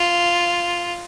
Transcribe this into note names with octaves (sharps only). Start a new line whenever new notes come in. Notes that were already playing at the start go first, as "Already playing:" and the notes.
Already playing: F4